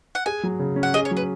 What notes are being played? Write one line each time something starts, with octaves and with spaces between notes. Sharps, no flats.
F#5
G#4 G#5
F#3
C#3
C#4
F#5
G#4 D#5
C#5
F#3
B4